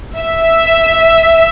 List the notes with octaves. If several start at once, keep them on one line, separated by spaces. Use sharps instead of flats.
E5